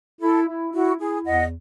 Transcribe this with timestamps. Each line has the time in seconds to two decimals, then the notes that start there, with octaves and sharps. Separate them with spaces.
0.21 E4 A4
0.48 E4
0.73 E4 F#4
0.99 E4 G#4
1.25 E2 D#5 F#5